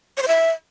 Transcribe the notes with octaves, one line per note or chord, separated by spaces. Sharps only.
C#5
C5
E5